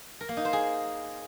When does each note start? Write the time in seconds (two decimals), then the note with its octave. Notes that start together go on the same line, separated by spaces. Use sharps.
0.21 A#4
0.29 A#3
0.37 D#4
0.45 C5
0.53 G#4